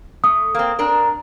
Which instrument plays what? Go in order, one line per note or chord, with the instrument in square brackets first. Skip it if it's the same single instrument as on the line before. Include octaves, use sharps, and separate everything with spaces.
[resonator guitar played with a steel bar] A3 [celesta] D#6
[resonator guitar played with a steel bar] A#3 C4
C4 D4 A#4